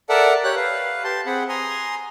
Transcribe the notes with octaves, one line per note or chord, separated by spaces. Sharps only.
A4 A#4 D5 E5 F#5 A5
G4 C#5 F#6
B4 F5
G4 A5 C6
C4 G#4 F#5 B5
G#5 A#5 C6 D#6